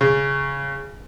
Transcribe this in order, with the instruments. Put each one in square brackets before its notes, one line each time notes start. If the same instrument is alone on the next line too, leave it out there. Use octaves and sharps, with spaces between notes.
[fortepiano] C#3